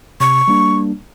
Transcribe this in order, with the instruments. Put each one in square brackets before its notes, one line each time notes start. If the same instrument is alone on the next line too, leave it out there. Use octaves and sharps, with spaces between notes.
[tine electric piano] C3 [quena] C#6
[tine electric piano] G3 A#3 D4